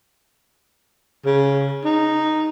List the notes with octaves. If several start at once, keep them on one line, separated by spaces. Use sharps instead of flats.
C#3
D#4